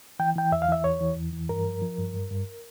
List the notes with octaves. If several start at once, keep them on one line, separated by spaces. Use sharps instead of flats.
E3 G5
E3 G5
E2 E5
F5
E3 E5
E2 C#5
E3
E2
E3
G2 A#4
F3
F3
G2
G2
G2